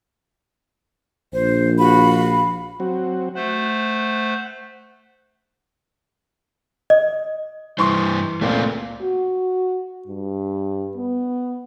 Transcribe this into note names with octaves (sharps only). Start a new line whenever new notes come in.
A#1 C5
F#4 F5 B5
F#3 C4 F#4
A3 C5 F#5
D#5
G2 E3 G3 C5 C6 C#6
C#2 A#2 A3 C4 F4
F#4
G2
B3